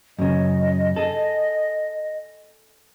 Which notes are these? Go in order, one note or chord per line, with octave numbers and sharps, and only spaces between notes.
F#2 C#3 D#5
G#4 A4